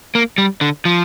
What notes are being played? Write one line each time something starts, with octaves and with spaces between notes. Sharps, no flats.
A#3
G3
D3
F3